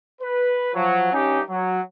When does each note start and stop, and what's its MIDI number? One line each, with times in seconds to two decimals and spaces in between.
0.22 0.73 71
0.75 1.12 53
0.75 1.12 54
1.13 1.42 43
1.13 1.42 61
1.13 1.42 63
1.13 1.42 67
1.49 1.80 54